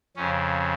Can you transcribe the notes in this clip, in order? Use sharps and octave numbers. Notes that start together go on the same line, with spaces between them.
F2 C#3 C#4